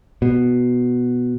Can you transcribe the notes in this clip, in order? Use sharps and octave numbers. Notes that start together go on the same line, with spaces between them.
B2